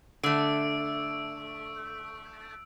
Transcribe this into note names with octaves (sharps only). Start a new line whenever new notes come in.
D3 A3 E6 D7